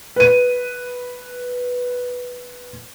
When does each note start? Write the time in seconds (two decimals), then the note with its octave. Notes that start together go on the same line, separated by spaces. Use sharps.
0.16 B4 D#7